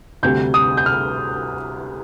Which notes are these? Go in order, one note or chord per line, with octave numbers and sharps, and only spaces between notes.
D2 C3 G3 G6
D#6
G6
F6